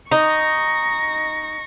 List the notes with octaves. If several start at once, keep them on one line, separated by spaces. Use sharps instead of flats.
D#4 C#6 A#6